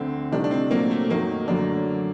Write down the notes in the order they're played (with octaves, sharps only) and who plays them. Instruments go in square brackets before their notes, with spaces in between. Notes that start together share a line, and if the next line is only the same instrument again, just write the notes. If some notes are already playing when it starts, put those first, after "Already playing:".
Already playing: [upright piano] D2 D3 A3 [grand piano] C4
[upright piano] C2 C3 D#3 A3 [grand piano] D4
[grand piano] D4
C4
[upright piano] A#2 F#3 A3 C4 [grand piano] A#3
[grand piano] A3
[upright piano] F#2 D#3 F#3 A3 D#4 [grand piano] A#3
[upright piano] F#2 D3 F#3 A3 [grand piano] D4